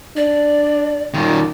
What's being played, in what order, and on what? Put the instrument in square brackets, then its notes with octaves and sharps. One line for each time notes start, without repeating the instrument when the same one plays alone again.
[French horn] D4 [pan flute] D5
[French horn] F#2 [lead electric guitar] A#2 D#3